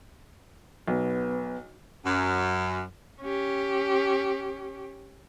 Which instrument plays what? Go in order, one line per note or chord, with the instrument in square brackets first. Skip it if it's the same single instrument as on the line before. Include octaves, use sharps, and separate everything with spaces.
[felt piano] B1 [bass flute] B3
[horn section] F#2
[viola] C#4 G4